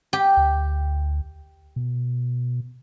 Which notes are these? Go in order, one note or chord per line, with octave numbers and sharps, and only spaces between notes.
G4
D2
B2